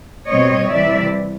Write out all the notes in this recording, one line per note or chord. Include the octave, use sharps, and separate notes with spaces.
B2 G3 C4 C#5 D#5
C3 E3 G3 D5 E5